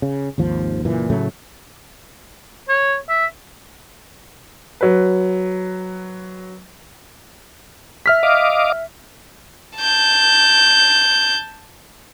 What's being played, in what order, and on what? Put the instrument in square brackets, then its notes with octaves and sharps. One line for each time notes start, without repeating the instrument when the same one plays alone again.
[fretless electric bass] C#3
G#1 D#2 F3
F#1 A#2 E3
A2 C#3 F#3 A3
[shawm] C#5
E5
[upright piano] F#3 B4
[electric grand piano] E5 F6 B6
[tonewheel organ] D#5 F5 D6
[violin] A5 G6